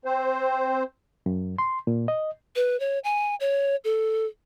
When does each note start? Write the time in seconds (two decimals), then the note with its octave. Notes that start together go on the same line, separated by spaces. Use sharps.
0.05 C4 C5
1.26 F#2
1.58 C6
1.87 A#2
2.08 D#5
2.56 B4
2.80 C#5
3.04 G#5
3.40 C#5
3.84 A4